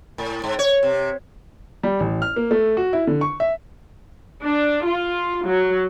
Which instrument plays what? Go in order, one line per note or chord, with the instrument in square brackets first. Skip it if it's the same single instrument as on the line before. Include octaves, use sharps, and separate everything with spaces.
[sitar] A2
G#2
C#5
C3
[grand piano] G3
A1
F6
A#3
A3
F#4
E4
D3
C#6
E5
[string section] D4
F4
F#3